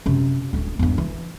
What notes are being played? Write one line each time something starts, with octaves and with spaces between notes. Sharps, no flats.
F#2 C3
D1 A3
E2 G2
E3